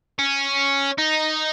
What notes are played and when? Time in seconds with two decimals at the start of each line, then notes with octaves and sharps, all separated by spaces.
0.19 C#4
0.98 D#4